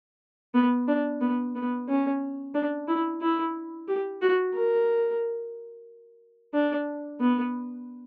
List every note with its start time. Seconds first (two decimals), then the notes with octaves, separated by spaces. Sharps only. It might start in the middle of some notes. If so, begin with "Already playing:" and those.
0.54 B3
0.88 D4
1.21 B3
1.55 B3
1.88 C#4
2.54 D4
2.88 E4
3.21 E4
3.88 G4
4.22 F#4
4.54 A#4
6.54 D4
7.20 B3